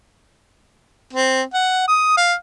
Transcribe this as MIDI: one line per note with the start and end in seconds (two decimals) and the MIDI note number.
1.13 1.42 60
1.54 1.85 78
1.88 2.16 87
2.17 2.34 77